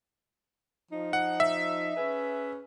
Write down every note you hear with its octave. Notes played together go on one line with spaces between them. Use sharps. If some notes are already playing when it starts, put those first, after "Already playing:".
F3 D#4
F#5
E5
C#4 G#4 B4